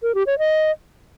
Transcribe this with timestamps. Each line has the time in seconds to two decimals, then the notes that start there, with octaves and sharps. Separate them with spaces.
0.03 A#4
0.15 G4
0.27 C#5
0.39 D#5